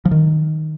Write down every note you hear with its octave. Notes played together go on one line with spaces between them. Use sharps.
F3
D#3